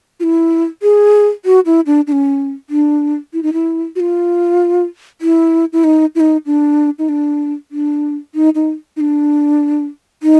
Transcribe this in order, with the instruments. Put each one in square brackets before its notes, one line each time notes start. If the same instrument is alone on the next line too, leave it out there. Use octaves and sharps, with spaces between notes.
[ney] F4
E4
G#4
F#4
E4
D4
D4
C#4
D4
E4
D#4
E4
F#4
F4
E4
E4
D#4
E4
D#4
D4
D#4
D4
D4
D#4
D#4
D#4
D4
D#4